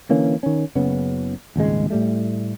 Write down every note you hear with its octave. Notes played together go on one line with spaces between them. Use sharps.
D3 E3 A#3 C#4
D#3 C#4
F#1 C#3 B3 C#4
D#1 G#1 C#2 G#3
A2 G3 A3